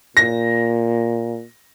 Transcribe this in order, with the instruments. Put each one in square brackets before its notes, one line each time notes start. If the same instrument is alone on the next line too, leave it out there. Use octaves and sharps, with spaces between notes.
[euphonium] A#2 [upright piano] A#6